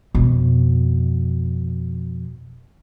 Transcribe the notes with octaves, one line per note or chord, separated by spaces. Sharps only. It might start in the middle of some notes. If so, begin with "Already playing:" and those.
F2 B2